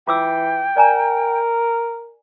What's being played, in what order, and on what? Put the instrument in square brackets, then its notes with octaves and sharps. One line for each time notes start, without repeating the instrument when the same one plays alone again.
[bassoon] E3 [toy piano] F4 D6 E6 [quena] G5
[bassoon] A#4 [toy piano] D5 G#5 A#5